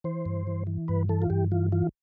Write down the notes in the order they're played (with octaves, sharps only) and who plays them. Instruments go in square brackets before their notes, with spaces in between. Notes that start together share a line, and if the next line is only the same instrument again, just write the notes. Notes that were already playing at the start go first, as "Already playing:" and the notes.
[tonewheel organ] E3 C5
G2
E3
E3
G2 B4
E3 A4
F4
G2 G4
E3 F4
E3 F4